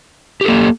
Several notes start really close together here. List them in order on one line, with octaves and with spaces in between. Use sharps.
G4 A4 A#3